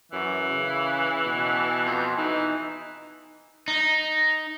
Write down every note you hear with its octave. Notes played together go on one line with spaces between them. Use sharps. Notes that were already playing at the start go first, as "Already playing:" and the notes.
F#2 E3
C#3
B2
F2
E3 D#4
D#4